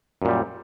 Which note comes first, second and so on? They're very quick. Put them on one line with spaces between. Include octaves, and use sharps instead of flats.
F#2 A#2 G3